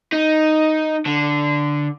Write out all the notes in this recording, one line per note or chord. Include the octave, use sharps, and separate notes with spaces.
D#4
D3